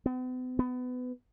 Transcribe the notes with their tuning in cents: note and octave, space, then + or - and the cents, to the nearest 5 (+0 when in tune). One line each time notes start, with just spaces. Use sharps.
B3 +45
B3 +25